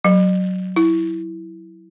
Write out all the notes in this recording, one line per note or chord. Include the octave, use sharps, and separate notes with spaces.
F#3
E4